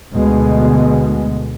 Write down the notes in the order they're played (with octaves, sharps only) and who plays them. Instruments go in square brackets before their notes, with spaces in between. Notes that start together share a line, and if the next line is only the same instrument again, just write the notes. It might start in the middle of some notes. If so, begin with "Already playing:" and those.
[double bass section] D2 B2 D3 G#3